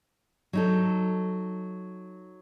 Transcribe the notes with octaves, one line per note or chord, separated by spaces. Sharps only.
F#3 D#4 A4